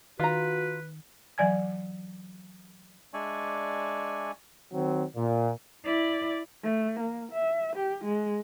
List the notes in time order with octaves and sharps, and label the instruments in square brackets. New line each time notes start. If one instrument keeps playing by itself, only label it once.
[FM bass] D#3 [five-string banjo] F4 A#5 [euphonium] F#4 [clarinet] B4
[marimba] E3 F#3 D5 G#5 G#6
[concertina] G#3 D4 D5 E5 G#5 C#6
[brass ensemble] D#3 F#3 C4
A#2
[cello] E4 D5
[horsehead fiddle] A3
A#3
E5
G4
G#3